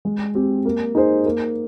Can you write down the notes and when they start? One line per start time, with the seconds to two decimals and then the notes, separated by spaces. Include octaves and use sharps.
0.05 G#3
0.35 C4 G4
0.65 A#3
0.95 D#4 G#4 C5
1.26 A#3